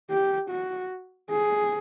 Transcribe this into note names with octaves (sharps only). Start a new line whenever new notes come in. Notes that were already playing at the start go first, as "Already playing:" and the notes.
G4
F#4
G#4